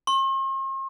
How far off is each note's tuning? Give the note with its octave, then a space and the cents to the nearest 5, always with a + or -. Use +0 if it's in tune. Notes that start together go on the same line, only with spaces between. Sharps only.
C6 +45